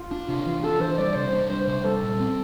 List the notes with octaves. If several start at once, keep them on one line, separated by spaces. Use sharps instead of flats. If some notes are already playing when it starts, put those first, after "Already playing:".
Already playing: F4
D4
C3
E3
D4 A4
E3 C5
G3 D5
C3 C5
D4
G3 C5
C3 C5
G3 A4
A#2
C4